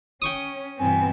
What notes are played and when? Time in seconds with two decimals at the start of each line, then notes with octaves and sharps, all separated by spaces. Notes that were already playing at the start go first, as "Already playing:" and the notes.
0.22 C#4 G5 C#6 D#6
0.79 G2 B2 E3 B3 C4 G#5